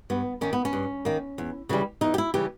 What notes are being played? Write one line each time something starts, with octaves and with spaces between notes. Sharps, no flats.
G2 B3
D#3 A#3 C#4
B3
C#4
G2
D#3 A#3
E2
C#3 E3 G3
E2 D#4
G4
E4
C#3 E3 G3 G4